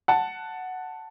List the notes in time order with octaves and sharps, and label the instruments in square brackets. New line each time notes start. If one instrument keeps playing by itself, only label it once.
[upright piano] F#5 A5